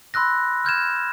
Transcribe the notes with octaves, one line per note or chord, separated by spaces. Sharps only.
B5 C6 E6 F#6 A#6
F6 G6 G#6 E7